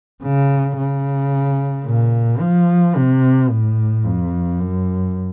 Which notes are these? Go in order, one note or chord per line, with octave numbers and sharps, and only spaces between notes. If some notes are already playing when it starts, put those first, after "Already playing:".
C#3
C#3
A#2
F3
C3
A2
F2
F#2